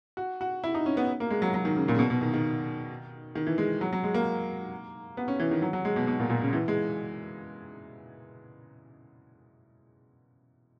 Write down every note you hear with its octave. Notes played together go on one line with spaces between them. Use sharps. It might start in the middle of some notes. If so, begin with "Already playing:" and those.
F#4
F#4
E4
D#4
C#4
B3
A#3
G#3
F#3
F#3
D#3
C#3
A#2
C#3
B2
B2
D#3
D#3
D#3
E3
G#3
F#3
F#3
G#3
A#3
B3
C#4
E3
D#3
F#3
F#3
G#3
B2
B2
A#2
A#2
C#3
E3
G#3